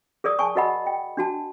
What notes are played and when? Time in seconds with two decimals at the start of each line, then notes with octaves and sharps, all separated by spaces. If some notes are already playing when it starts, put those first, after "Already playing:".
0.24 G#4 A#4 D5 D#6
0.39 G#5 A5 C#6
0.56 F#4 A#4 D#5 F#5 B5
0.86 G5
1.17 D4 F#4 A5